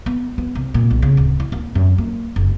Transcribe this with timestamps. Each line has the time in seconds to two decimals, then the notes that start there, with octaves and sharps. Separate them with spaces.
0.06 B3
0.38 B3
0.55 C2
0.74 A#2
0.91 B1
1.02 C#3
1.17 D1
1.40 E4
1.52 D#2
1.75 F#2
1.98 A#3
2.36 F#1